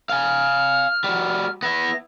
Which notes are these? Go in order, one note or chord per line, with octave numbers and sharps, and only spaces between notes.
F5 G#5 F6
G3 F#4
B3 E4 A#6